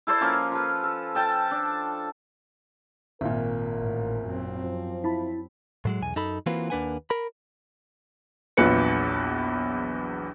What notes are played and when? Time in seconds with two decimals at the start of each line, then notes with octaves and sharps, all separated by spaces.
0.07 E4 A4 C5 D5
0.21 F3 A#3 C#4
0.52 F4 A4 B4
0.83 A4
1.15 A4 G5 A5
1.51 D4
3.21 G#1 A#2 A#4 E5 F5
3.78 A1
4.26 F#2 C4
4.60 F3
5.04 E4 A5 B5
5.85 A2 F#3 G#3
6.02 B1 E2 G#5
6.16 F#2 D#4 A4 B5
6.46 E3 A#3 C4 F4 F#4 B4
6.70 D#2 A#3 D4 B4 F#5 G#5
7.10 A#4 B5
8.57 A#1 E2 F#3 F4 B4 C#7